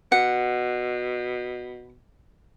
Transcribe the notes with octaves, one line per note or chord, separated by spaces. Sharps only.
B2 F#5